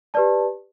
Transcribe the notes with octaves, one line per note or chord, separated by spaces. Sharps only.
G4 B4 D5 A5